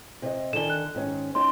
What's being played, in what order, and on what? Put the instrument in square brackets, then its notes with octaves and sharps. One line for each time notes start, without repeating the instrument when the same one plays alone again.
[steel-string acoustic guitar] C3 D#5
[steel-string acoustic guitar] D3 D#3 G#5 [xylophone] E7 G7
[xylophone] F#6
[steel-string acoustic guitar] G#2 D#3 C#4
[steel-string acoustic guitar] C#4 D#4 G4 [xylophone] C6